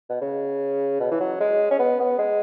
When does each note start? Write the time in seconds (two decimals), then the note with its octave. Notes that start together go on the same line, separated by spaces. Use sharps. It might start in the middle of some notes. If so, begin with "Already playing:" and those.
0.09 B2
0.21 C#3
1.00 B2
1.11 E3
1.20 F#3
1.40 G#3
1.71 C#4
1.79 B3
2.00 B3
2.19 G#3